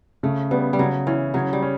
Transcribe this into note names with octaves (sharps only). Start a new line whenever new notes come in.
C#3 A3
G3 B3
G3
C#3 F#3
E3 C#4
C#3 F#3
G3
C#4